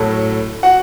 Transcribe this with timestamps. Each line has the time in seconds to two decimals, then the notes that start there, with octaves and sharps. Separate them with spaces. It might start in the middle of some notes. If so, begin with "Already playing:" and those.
Already playing: A2 F#3 A3 A4
0.63 F#4 F#5